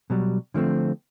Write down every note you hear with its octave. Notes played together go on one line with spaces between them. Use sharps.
B2 F#3 G3
D3 F3 A3 C4